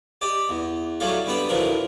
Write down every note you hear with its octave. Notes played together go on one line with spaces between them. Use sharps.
G4 D5 D#5
E2
F#3 G3 A3 G#4 A4 F5
D3 G3 B3 B4 G5
A1 D2 A2 F3 A#4 B4